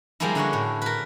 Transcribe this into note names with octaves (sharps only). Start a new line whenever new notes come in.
F3 G3 G#3 A#3 D#4 E4
D3 G#3 F#4 C#5
A2
A#4 B4